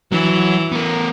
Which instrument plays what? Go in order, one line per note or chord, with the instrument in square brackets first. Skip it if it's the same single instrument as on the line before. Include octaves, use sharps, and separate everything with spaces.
[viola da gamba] E3 [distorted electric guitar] F#3
[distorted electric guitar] B3 A#4